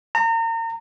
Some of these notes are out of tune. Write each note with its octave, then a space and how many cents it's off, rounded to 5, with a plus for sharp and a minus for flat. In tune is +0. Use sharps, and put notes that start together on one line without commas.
A#5 -35